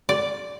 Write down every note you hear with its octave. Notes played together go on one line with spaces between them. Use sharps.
D5